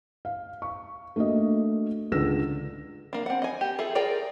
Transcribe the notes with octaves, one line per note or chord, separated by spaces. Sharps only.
F5
C#6
A3 A#3 D4 F#4 D#5
C#2 D3 A4 E6 A#6 E7
A#3 D4
C4 F#5
D#5 G#5
G4
F4 G#4 A4 E5
F4 G#4 A#4 D5 G5